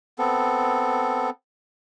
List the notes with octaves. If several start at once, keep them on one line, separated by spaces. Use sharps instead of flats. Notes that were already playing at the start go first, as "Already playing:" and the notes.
B3 C4 A4